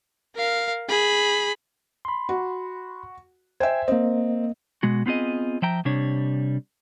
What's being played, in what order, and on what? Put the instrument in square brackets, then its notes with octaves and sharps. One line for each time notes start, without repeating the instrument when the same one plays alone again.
[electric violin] A#4 F5
G#4 B5
[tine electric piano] B5 C6
[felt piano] F#4
[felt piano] C5 E5 [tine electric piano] G5 G#5 G#6
[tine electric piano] A#3 D#5 [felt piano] C4
[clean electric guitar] B2 G#3 F#4
B3 C4 F4 G#4 D#5
F3 E5 G5 A#5
C3 G3 D4 C#5